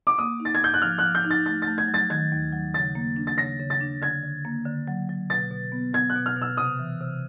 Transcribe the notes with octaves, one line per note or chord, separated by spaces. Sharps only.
D6
A#3 D#6
D#4
A6
G#6
G#2 G6
F#6
F3 F6
F#6
F3
G6
D#4
A6
A3 A6
A6
A3
G#6
F#3
A6
D#3 G#6
D#2
F#3
C#3 A6
A#3
D4
A6
C#3 A#6
C#3
A6
D4
D3 G#6
D3
A#3
D3
F#3
F#3
B2 A6
B2
B3
B3 G#6
F#6
B2
F6
B2 E6
C3 D#6
E3
C3